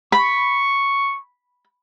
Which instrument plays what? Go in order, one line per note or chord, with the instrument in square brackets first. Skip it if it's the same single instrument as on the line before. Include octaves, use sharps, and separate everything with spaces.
[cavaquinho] B5 [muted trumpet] C#6